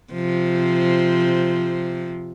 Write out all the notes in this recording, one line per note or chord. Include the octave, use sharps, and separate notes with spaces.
C3 F3